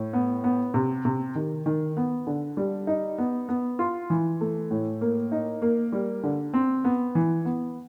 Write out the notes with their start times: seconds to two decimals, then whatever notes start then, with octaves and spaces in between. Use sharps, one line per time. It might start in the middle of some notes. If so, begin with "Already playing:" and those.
Already playing: A2
0.13 B3
0.44 B3
0.74 C3
1.05 C3
1.35 D#3
1.66 D#3
1.97 B3
2.27 D3
2.57 G3
2.87 D#4
3.18 B3
3.49 B3
3.79 F4
4.10 E3
4.41 A3
4.71 A2
5.01 A#3
5.32 D#4
5.62 A#3
5.92 G3
6.23 D3
6.54 C4
6.84 B3
7.15 E3
7.45 B3